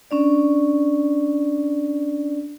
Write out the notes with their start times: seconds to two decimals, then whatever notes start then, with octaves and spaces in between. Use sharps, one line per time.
0.11 C#4 D4 D5